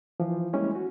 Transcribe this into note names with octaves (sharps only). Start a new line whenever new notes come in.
E3 F3
G3 G#3 A#3 C#4 E4
F#4